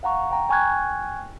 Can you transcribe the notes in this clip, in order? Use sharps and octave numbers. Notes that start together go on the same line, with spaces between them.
F5 F#5 A#5 C#6
G5 A#5
G5 G#5 C#6 F6 F#6 G#6